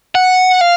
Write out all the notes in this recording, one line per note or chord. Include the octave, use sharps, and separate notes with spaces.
F#5
F5